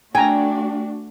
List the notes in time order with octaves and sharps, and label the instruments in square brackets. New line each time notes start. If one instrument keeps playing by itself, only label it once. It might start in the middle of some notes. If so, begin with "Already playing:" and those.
[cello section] A3 D4 F#4 [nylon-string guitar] G5 [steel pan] G#5 A#5